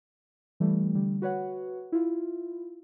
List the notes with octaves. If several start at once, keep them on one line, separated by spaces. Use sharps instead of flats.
E3 G3 A3
D3 G3
F#4 B4 C#5 F#5
E4 F4